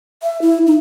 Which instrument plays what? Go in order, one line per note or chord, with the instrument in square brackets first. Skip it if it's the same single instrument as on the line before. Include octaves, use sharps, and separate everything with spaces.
[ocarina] E5
E4
D#4